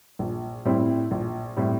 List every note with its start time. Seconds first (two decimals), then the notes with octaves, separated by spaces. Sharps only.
0.19 A#1
0.65 A2 G3 C4 E4
1.11 A#1
1.56 A2 G3 C4 E4